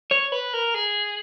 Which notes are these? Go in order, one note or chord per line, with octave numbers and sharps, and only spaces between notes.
C#5
B4
A#4
G#4